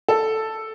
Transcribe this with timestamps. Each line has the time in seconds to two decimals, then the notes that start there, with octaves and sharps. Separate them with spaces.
0.08 A4